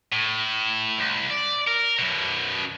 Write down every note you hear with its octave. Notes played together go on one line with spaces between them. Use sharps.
A2
C2
D5
A#4
F#2 B2